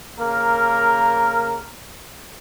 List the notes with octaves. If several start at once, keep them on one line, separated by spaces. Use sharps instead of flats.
C#3 A#3 A#4